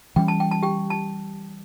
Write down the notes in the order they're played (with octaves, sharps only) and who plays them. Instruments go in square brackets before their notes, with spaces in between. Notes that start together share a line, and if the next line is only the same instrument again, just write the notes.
[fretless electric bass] E3 G3 C#4 [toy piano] G5
[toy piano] A5
G5
A5
G4 G5
A5